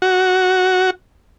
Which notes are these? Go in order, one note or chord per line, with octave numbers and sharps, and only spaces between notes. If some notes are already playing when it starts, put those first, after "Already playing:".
F#4